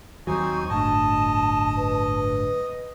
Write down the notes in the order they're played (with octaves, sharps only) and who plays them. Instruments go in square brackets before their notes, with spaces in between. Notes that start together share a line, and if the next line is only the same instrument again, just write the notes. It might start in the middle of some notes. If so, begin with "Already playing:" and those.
[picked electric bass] D#2 F#3 [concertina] C4 D#4 G#5 [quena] C#6
[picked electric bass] D1 G1 D2 [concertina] D#5 [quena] A5
[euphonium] B4